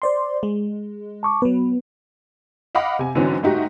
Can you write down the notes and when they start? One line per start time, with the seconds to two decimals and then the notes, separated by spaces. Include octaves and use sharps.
0.02 C5 D5 C6
0.43 G#3
1.23 A5 C#6 D6
1.42 F#3 B3 B4
2.75 D#5 F5 F#5 B5 D6
2.99 C3 G#5
3.15 G#2 D3 E3 F#3 C4 C#4
3.43 G#2 A3 D#4 F#4 G4